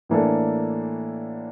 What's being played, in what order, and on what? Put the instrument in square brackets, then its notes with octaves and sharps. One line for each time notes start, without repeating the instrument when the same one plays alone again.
[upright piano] A2 E3 A#3 D4 A4